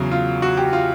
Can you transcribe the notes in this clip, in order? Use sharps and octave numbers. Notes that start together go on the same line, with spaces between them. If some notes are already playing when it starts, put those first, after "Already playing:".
Already playing: E2 C#3 F#3
F4
F#4
G4
F4